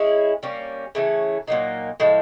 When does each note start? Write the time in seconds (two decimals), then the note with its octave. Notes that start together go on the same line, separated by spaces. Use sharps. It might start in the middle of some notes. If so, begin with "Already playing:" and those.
Already playing: G#3 C#4 E4 G#4
0.43 G3 A#3 C#4
0.95 C#3 E3 A3 C#4
1.47 A#2 F#3 A#3 D#4
2.00 A2 F3 G#3